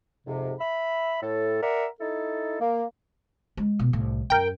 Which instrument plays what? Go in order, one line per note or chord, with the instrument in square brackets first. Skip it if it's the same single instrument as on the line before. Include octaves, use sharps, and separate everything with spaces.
[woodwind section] F2 G#2 C3
E5 B5
A2 A4
A#4 D5 E5 F#5
D#4 E4 A4
A#3
[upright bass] G#3
B2
C2 A2
[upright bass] F#2 [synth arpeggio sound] A#4 G5